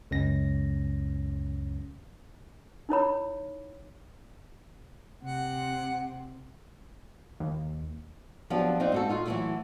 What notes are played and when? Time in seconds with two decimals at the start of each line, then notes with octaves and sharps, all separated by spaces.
0.11 C#2 F#2 C#4 A#6
2.89 D#4 E4 C#5 B5
5.24 C3 F#5
7.40 D#2
8.50 F3 F#3 B3 C4 D4 G4
8.80 C4 D#4 D5 F5 F#5
8.92 G#2 F#4 A4
9.09 D#4 F4 F#4
9.25 E3 F#3 G#3 A3 E4 A4